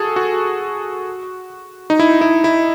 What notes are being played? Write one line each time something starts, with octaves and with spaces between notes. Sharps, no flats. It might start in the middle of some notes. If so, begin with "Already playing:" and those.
Already playing: F#4 G#4 A4
F#4
D#4
E4
E4
E4